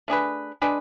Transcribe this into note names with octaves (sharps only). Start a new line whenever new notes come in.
A3 D4 G#4 B4
G#3 D4 G#4 B4